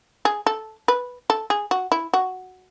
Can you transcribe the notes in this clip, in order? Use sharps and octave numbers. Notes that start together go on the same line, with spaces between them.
G#4
A4
B4
A4
G#4
F#4
E4
F#4